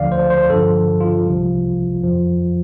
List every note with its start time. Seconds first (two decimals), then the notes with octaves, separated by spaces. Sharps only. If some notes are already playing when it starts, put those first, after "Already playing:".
Already playing: D2 D3 F3 D5 F5
0.12 C5
0.30 C5
0.49 G2 D3 F3 A4
1.00 F4
1.26 C2 C3 F3
2.03 F2 F3